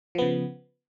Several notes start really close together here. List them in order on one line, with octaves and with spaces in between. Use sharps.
F3 B3 C#3